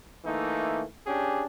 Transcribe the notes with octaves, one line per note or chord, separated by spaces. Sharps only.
E3 A3 A#3 D#4
C#4 D4 G4 G#4